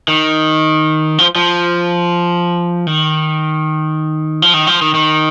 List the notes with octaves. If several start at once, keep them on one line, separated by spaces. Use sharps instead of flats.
D#3
F3
F3
D#3
F3
D#3
F3
D#3
D#3